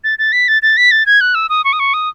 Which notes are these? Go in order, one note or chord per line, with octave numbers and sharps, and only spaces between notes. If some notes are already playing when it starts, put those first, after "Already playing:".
A6
A6
B6
A6
A6
B6
A6
G#6
F#6
E6
D#6
C#6
D#6
C#6
D#6